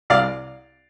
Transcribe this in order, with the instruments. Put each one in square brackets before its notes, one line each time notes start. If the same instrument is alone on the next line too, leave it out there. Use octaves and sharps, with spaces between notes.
[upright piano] C2 D5 F5